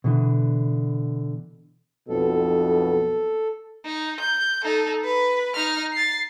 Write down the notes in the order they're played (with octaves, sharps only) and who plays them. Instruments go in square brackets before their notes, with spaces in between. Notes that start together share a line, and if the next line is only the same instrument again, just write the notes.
[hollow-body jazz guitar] B2 D3 E3
[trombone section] B1 F2 B2 [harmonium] A4
[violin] D#4
G6
D#4 A4
B4
D#4 F6
A6 C7